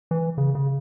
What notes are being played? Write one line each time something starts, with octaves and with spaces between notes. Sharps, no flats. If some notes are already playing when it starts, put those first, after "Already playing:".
E3
C#3
C#3